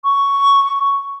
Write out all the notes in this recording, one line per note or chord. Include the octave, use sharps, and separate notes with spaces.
C#6